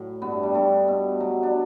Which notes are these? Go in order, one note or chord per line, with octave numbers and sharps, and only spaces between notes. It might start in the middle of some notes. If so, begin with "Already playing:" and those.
Already playing: A2 F#3
G2 B3
A3
G3
G2 A3
B2
F#3
D4